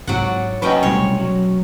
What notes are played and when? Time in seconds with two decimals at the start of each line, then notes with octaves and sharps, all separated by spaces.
0.07 G#2 F#3 C4 D5 F#5
0.62 F#3 C#4 B4 D#5 G5
0.83 C2 B2 A3 C#5 C6
1.18 F#3